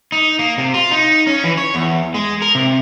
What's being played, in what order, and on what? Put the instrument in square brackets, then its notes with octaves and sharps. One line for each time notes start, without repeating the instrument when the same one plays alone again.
[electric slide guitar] D#4
A#3
C3
F4
D#4
C#4
E3
C#5
E2
G#3
A#4
C3